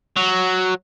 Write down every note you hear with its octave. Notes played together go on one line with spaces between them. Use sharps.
F#3